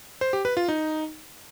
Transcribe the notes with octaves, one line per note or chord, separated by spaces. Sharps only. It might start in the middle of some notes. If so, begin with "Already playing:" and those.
C5
G4
B4
F4
D#4